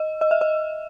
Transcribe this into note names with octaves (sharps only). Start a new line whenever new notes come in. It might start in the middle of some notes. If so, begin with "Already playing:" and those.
Already playing: D#5
D#5
E5
D#5